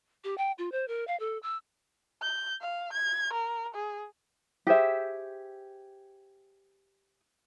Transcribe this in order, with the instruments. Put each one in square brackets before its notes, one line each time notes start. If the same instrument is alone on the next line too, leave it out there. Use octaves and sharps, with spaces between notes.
[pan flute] G4
G5
F4
C5
A#4
F5
A4
E6
[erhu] G6
F5
G#6
A#4
G#4
[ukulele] G4 G#4 C5 E5